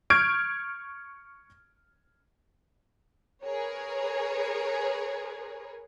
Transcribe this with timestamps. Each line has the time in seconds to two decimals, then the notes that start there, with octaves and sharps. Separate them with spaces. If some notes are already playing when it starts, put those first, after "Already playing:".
0.10 C#6 F6 G6 G#6 D7
3.44 G#4 A#4 B4 C#5